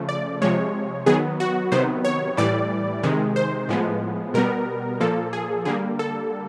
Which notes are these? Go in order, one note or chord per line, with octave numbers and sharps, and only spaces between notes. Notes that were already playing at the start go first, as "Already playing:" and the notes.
Already playing: C#3 F3 A3
D5
C3 F3 G#3 C#5
D#3 F#3 B3 G#4
F#4
C3 D#3 F#3 B3 C5
C#5
A2 E3 G3 D5
C3 D#3 G#3
C5
A2 F3 G#3 B3
B2 G3 B3 A#4
A#2 F3 A#3 A4
G#4
D3 G3 A#3 G#4
A4